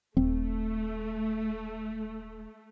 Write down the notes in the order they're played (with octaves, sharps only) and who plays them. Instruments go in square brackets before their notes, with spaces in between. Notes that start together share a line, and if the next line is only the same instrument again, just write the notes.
[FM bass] D#1 [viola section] A3 [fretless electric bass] C4